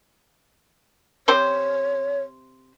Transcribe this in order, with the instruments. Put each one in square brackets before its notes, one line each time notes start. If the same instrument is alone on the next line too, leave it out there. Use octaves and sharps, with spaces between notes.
[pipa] C3 C4 C5 [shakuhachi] C#5